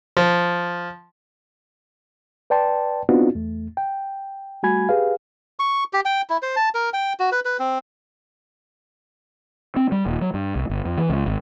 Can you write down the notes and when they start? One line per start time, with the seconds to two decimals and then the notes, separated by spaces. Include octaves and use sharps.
0.17 F3
2.50 B4 D5 G5 A5 C6
3.09 B3 C4 D4 D#4 F4 F#4
3.35 E2 A3
3.77 G5
4.63 G3 A3 F#4 G#5 B5 G#6
4.89 G4 G#4 B4 F5
5.59 C#6
5.93 G4
6.05 G5
6.30 E4
6.42 C5
6.56 A5
6.75 A#4
6.93 G5
7.20 F#4
7.32 B4
7.45 B4
7.59 C4
9.76 C4
9.92 G3
10.06 D#1
10.21 F#3
10.34 G2
10.56 C2
10.70 G1
10.85 F2
10.98 E3
11.09 C#2
11.26 G#1